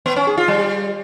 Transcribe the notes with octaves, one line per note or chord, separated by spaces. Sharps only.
B3
C#4
G#4
F4
G3